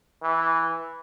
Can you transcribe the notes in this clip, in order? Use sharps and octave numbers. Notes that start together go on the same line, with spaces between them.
E3